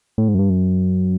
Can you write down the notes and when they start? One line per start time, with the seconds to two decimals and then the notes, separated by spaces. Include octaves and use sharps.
0.18 A2
0.28 G#2
0.34 F#2
0.39 G2
0.50 F#2